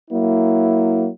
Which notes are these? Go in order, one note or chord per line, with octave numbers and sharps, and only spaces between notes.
F#3 A#3 E4